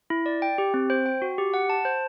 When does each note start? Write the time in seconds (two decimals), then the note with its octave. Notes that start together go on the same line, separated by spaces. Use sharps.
0.10 E4
0.26 D5
0.42 G5
0.58 G4
0.74 C4
0.90 C5
1.06 G5
1.22 F#4
1.38 G4
1.54 F#5
1.70 A5
1.85 C5